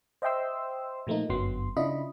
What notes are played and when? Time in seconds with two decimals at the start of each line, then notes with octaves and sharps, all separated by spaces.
0.22 C5 D#5 E5 G5 C6 E6
1.07 A#2 F3 A3 A#3 D#4
1.29 G1 F#2 D3 F#3 B3 C6
1.77 C#3 D4 E4 F4 D#5 B5